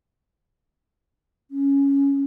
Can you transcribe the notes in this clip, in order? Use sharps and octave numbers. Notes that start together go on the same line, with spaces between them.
C#4